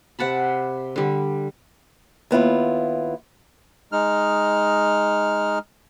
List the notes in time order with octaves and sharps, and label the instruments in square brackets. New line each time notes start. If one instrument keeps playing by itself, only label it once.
[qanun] C3 F#5 A5 B5
D3 G3
[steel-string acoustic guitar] D#2 B3 E4 F4
[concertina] G#3 D#4 F6